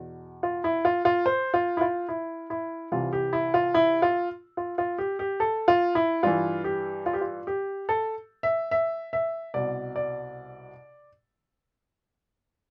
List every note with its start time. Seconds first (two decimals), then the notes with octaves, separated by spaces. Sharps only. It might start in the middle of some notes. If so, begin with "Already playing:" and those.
Already playing: E2 B2
0.43 F4
0.64 E4
0.85 F4
1.05 F4
1.26 C5
1.54 F4
1.77 E4
1.81 F4
2.09 E4
2.50 E4
2.92 C2 C3 E3 F4
3.13 G4
3.33 E4
3.54 F4
3.74 E4
4.02 F4
4.57 F4
4.78 F4
4.98 G4
5.19 G4
5.40 A4
5.68 F4
5.95 E4
6.23 G2 E3 F4
6.64 G4
7.06 F4
7.13 G4
7.21 F4
7.47 G4
7.89 A4
8.43 E5
8.71 E5
9.13 E5
9.54 C2 B2 D5
9.96 D5